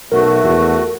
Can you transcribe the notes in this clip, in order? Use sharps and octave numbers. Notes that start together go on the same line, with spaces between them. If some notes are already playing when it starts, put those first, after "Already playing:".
B1 A3 F#4 A#4
E2